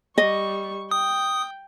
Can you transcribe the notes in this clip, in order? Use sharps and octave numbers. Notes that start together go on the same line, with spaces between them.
G3 D#5 C#6
G5 D#6